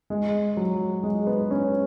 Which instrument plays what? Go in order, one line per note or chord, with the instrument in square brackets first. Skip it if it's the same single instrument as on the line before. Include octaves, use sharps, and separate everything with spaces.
[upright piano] G#3
F#3
G#3
B3
C#4